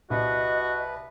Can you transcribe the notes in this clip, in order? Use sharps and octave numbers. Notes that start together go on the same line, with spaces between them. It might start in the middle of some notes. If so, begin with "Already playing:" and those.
C2 F#4 B4 D#5